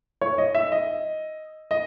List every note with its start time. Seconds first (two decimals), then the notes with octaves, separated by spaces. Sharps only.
0.21 C#5
0.38 D#5
0.55 E5
0.72 D#5
1.71 D#5